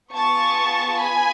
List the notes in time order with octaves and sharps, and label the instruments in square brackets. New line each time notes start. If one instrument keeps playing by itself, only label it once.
[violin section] B3 F4 G#4 A5 C#6
G#5 B5